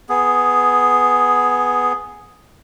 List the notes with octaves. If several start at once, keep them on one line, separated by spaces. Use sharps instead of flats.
B3 G#4